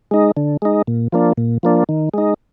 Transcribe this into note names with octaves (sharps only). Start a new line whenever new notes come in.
G#3 D#4
D3
G#3 D#4
A#2
F3 A#3 D4
A#2
F3 A#3 D4
D#3
G#3 D#4